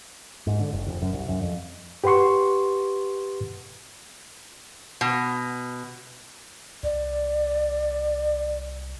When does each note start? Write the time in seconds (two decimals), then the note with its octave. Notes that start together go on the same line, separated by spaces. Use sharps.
0.47 G#2
0.60 D3
0.73 F#1
0.86 F1
1.02 F#2
1.13 C2
1.28 F#2
1.42 F2
2.04 G4 B4 F#5 C6 C#6
5.01 B2
6.83 C2 D5